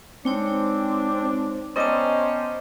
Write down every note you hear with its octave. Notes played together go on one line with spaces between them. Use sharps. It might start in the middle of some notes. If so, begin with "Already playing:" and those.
G#3 C4 D4 D#4 C#5
B3 C#4 C5 D5 D#5 G5 A5 A#5